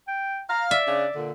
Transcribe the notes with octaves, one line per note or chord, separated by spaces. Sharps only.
G5
F5 A#5
D5 E5
C#3 D4
A#2 D3